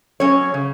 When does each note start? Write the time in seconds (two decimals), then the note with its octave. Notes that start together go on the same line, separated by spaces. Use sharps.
0.20 F#3 C#4 C#5
0.54 C#3